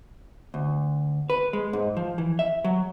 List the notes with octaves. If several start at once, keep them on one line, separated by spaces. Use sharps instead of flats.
D2
B4
G#3
G#2
F3
E3
E5
F#3